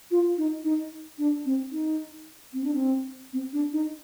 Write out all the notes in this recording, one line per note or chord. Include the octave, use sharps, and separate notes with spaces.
F4
D#4
D#4
D4
C4
D#4
C4
D4
C4
C4
D4
D#4